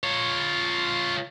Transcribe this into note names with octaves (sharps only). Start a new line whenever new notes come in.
F4 C#5